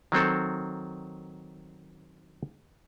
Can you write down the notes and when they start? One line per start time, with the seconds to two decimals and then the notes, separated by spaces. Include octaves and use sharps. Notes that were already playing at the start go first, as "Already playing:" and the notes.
0.12 D#3 F#3 C4 A4